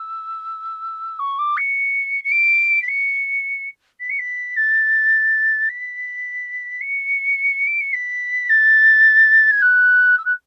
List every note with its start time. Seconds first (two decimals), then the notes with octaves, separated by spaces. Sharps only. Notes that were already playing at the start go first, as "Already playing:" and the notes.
Already playing: E6
1.19 C#6
1.38 D6
1.57 C#7
2.24 C#7
2.31 D7
2.82 B6
2.88 C#7
4.00 B6
4.09 C#7
4.19 B6
4.56 A6
5.69 B6
6.81 C#7
7.67 D7
7.80 C#7
7.93 B6
8.49 A6
9.51 G#6
9.62 F#6
10.18 E6
10.25 F#6